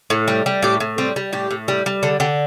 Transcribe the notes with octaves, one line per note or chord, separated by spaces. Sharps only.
A2
G3
G3
A2 G4
A2
G3 C4
G3
A2 G4
A2
G3
G3
D3 A4
D3 G4